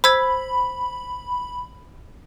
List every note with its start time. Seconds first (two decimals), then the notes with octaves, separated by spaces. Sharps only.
0.04 C5 B5 E6 G#6